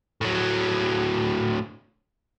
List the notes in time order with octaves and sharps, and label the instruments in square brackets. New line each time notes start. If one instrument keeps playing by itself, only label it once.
[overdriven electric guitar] A2 F#3